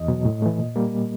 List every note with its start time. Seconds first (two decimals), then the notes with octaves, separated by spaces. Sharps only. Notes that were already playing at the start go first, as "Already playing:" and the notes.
Already playing: E2 D#5
0.08 B2 F#3
0.25 A2
0.42 E3 A3
0.59 A#2
0.76 G3 A#3